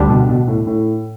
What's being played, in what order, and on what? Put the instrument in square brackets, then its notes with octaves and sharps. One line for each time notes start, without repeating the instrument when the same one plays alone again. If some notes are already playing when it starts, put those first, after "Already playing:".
Already playing: [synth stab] D2 D3 G3 D4 G4
[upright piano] B2
B2
A2
A2